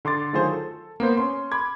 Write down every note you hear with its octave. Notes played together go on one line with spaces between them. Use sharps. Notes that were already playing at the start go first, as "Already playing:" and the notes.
D3 C6 D6 A6
D#3 F#3 A3 F4 G#4 C5
A4
A#3 B3 C5
C#4 C6
B5 D6 G#6